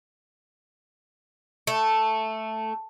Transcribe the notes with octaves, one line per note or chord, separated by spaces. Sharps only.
A3